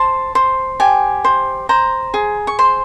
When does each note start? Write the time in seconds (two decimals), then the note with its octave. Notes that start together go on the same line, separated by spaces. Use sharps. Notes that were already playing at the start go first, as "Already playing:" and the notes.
Already playing: C5 A5
0.35 C5
0.80 G4 G#5
1.25 C5
1.69 C5 A#5
2.14 G#4
2.47 C#6
2.59 C5 C6